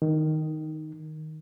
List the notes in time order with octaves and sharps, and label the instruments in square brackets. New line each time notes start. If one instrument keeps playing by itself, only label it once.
[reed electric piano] D#3